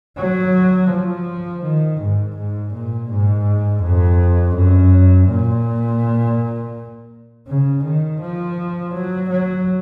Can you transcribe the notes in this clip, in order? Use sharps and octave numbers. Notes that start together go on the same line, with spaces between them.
F#3
F3
D#3
G#2
G#2
A#2
G#2
F2
F#2
A#2
C#3
D#3
F3
F#3
F#3